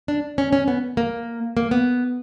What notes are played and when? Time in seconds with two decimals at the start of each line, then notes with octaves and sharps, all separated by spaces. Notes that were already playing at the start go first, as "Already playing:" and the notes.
0.08 D4
0.38 C#4
0.53 C#4
0.68 B3
0.97 A#3
1.57 A#3
1.71 B3